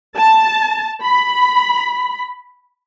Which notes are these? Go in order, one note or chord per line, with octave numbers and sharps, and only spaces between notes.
A5
B5